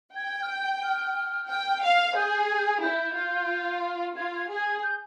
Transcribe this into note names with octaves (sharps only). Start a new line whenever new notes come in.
G5 G#6
F6
G6
F6
G5
F5
G#4 G6
G#6
G6
G#6
E4 G6
F4
F4 G#6
G#6
G#4
G#6
G6